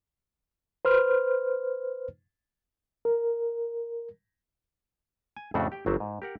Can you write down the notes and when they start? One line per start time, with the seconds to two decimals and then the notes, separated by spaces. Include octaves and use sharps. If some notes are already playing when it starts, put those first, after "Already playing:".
0.85 B4 C5 F6
3.05 A#4
5.36 G#5
5.54 F2 A2 C#3 A3 D4 F#4
5.72 G4 G5
5.86 G1 F#3 C4 E5
6.00 G#2
6.22 G4 A#4 F#5